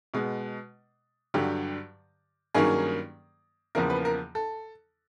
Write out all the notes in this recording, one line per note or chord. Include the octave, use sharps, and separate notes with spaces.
B2 G#3 B3
G2 D3 F#3 G4
G2 D#3 F#3 A#3 C#4 G#4
E2 C#3 F3 A#3 A#4
B4
A#4
A4